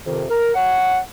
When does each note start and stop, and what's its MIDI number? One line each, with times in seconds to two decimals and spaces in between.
0.06 0.24 41
0.06 0.24 48
0.06 0.24 51
0.30 0.50 70
0.55 0.99 73
0.55 0.99 78